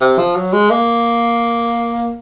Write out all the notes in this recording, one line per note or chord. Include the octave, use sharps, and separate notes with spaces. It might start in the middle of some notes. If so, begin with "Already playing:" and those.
C3
F3
F#3
G#3
A#3